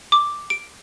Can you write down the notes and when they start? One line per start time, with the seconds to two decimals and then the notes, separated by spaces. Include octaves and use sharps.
0.12 D6
0.50 D7